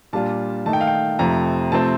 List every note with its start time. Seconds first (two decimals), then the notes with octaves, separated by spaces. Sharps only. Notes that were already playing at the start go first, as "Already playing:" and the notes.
0.13 A#2 G3 D4 F4 A5
0.66 D#3 A3 D#4 A5
0.73 G5
0.81 F5
0.87 G5
1.19 F2 C3 F3 A3 A#5
1.72 C3 F3 A3 C4 A5